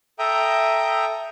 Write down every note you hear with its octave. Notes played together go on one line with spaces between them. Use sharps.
A4 E5 G5 A#5 D#6